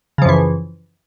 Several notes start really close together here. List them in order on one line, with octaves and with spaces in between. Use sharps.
C#3 F3 F#2 E3